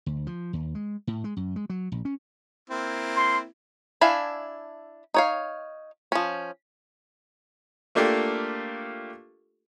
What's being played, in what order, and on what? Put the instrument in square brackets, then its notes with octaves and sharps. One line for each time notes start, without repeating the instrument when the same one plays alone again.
[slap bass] D2
F3
D#2
G#3
A2
G#3
F#2
G#3
F#3
A#1
C#4
[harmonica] A#3 C4 E4
[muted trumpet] C6
[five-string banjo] D4 E4 E5 F5 G#5
D#4 C#5 F5
F3 C#4
[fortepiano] A3 A#3 D4 F4 G4 A4